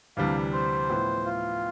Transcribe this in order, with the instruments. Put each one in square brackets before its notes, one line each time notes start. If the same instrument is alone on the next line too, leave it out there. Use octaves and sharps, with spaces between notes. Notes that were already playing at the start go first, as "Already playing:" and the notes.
[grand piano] D2 C3 E3 G3 D4 [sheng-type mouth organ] F5
[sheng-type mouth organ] C5
[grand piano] A2 F3 B3 E4
[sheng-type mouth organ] F4